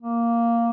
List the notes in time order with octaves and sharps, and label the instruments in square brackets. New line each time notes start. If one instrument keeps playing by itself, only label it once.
[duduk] A#3